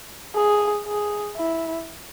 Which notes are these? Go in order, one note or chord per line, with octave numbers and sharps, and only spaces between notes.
G#4
G#4
E4